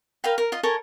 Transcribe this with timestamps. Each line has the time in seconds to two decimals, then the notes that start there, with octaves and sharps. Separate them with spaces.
0.24 A#4 B4 F5 G5
0.38 A#4
0.52 F4 D#5
0.63 A4 A#4 C#5 G#5